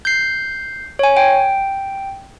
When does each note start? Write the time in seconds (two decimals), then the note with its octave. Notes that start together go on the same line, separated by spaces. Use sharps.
0.05 G6 C7
0.99 C#5 G#5
1.17 G5